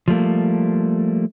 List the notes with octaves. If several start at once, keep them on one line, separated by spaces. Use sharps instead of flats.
F3 G3 A3 A#3